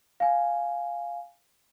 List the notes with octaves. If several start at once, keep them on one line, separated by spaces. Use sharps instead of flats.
F5 G#5